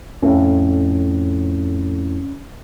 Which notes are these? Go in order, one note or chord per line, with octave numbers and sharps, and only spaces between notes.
F2 A2 C#4